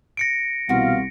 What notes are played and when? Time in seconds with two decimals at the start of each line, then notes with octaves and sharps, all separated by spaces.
0.17 A#6 C#7 D7
0.69 C2 B2 E3 F#4 F5 C6